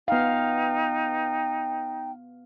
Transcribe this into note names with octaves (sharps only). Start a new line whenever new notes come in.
B3 D#4 F5 G5